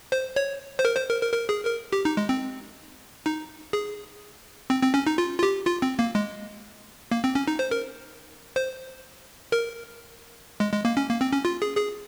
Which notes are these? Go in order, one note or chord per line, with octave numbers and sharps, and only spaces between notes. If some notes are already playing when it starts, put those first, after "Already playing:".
C5
C#5
C5
A#4
C5
A#4
A#4
A#4
G#4
A#4
G4
D#4
G#3
C4
D#4
G#4
C4
C4
C#4
D#4
F4
F4
G4
F4
C4
A#3
G#3
A#3
C4
C#4
D#4
C5
A#4
C5
A#4
G#3
G#3
A#3
C#4
A#3
C4
C#4
F4
G#4
G#4